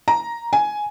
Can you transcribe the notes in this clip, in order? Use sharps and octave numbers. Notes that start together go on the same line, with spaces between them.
A#5
G#5